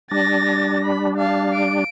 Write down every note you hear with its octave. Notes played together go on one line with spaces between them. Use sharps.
G3 D4 A6 A#6
B5
F5 A5
D7